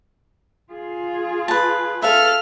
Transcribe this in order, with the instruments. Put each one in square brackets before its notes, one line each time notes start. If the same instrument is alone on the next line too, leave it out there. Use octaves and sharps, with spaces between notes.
[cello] F4 G#4
[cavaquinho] B4 A5
[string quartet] A4 F6 [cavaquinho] E5 F5